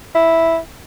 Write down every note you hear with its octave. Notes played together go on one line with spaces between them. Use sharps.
E4